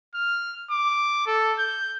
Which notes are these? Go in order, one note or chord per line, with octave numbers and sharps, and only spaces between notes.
F6
D6
A4
G6